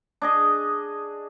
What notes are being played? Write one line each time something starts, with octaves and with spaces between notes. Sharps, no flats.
D4 G#4 D#5